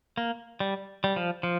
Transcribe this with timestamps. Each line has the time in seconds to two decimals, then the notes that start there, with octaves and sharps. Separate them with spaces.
0.17 A#3
0.60 G3
1.04 G3
1.16 F3
1.43 F3